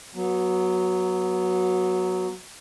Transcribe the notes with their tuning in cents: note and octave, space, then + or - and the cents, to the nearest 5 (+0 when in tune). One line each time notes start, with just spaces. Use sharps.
F#3 +0 B3 -25